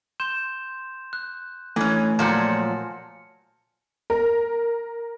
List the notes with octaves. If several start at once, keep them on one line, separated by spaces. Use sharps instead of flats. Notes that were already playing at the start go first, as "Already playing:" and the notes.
C6 G6 E7
F#6
E3 A3 C#4 G#5
A#2 F3 F#3 A5 F6 C#7
A#4